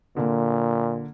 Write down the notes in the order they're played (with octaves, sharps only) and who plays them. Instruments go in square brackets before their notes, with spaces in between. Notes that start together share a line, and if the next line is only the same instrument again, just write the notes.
[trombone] A#2 [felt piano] D3 A#3